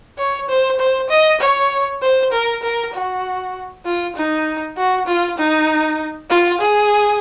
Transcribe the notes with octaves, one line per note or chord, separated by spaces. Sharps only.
C#5
C5
C5
D#5
C#5
C5
A#4
A#4
F#4
F4
D#4
F#4
F4
D#4
F4
G#4